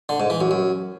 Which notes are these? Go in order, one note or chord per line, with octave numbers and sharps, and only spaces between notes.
D3
G#2
E3
F#2
F#2